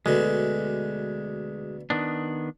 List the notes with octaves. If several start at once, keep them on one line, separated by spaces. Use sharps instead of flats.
D2 B2 D3 G#3
D#3 B3 D4